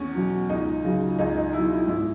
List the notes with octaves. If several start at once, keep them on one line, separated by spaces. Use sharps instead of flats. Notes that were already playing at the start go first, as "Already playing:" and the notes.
Already playing: E2 C#4
B2 F#3
C#2 D#4
C#3 F#3
C#2 D#4
D#4
B2 F#3 E4
E4
G#2 E4